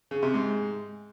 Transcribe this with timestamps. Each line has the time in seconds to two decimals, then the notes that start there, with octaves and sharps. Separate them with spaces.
0.11 C#3
0.23 C3
0.34 G#2